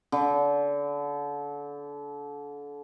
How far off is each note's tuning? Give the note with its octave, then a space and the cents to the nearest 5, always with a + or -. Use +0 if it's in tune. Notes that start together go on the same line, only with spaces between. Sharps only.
D3 -30